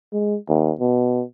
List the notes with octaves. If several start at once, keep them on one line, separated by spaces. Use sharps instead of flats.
G#3
D#2
B2